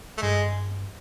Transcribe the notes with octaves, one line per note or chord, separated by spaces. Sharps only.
A3
G2 G#3